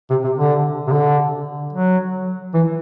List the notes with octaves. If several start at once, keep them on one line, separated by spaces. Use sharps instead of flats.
C3
C3
D3
C3
D3
F#3
E3